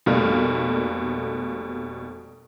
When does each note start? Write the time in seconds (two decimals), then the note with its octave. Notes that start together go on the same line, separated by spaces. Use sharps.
0.06 F1 B2 G3 A3 A#3 F6